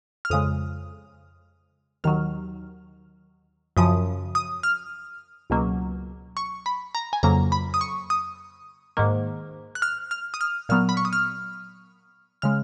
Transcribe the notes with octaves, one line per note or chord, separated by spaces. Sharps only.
F6
F2 C#3 G#3 D#6
D#2 D#3 F#3 F6
F#2 C#3 F3 D#6
D#6
F6
C#2 B2 F#3 A#3
C#6
B5
A#5
G#5
F2 C#3 F#3 A#3 A#5
B5
D#6
C#6
D#6
G#2 D#3 A#3
F#6
F6
F6
D#6
F6
A#2 F#3 B3 F6
B5
C#6
D#6
F6
C#3 G#3 F6